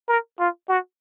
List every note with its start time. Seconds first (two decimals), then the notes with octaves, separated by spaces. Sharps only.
0.09 A#4
0.39 F4
0.69 F#4